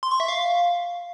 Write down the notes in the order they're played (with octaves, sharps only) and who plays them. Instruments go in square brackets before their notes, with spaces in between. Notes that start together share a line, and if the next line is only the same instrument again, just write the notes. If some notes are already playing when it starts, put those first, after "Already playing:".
[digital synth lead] C6
C#6
E5
F5